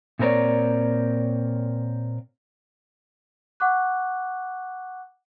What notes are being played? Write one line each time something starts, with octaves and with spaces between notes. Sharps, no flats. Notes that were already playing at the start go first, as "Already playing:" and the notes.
A#2 A3 C4 A#4 C#5 D5
F#5 C#6 D6 F#6